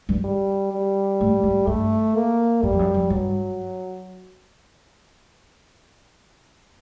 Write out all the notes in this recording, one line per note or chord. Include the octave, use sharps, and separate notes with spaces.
G2
G3
G3
A2
G#2
G2 A3
A#3
G2 G3
F2
F#2
F#2
G2 F#3